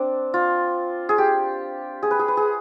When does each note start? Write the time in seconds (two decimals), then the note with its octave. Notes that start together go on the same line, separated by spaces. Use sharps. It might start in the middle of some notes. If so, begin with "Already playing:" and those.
Already playing: C4 D4
0.34 F4
1.09 G#4
1.18 G4
2.03 G#4
2.11 B4
2.19 G#4
2.28 B4
2.37 G#4